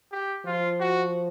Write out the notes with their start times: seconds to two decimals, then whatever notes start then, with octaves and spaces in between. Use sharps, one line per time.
0.12 G4
0.45 F3 F4
0.80 F#4